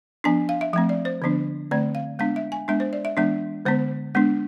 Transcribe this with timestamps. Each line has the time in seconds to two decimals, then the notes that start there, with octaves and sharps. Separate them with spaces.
0.24 F3 B3 D4 G#5
0.49 F5
0.61 E5
0.73 F3 A3 C4 E5
0.89 D5
1.05 C5
1.22 D3 F3 B3 D4
1.71 D3 A3 C4 D5
1.95 F5
2.19 G#3 B3 D4 F5
2.36 E5
2.52 G#5
2.68 G#3 B3 D4 E5
2.80 C5
2.93 D5
3.05 E5
3.17 E3 G#3 B3 D4 E5
3.65 D3 G#3 B3 C5
4.15 G#3 B3 D4